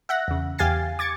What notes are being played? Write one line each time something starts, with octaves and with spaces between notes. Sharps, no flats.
E5 F#5 F#6 A#6
E2 C#3
E2 G4 F5 G#5 A6 C7
D6 G#6 A6 C#7